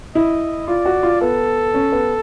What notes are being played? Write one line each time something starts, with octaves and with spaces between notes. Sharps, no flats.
E4 D#5
F4 D5
F#4
F4
B3 A4
C#4
B3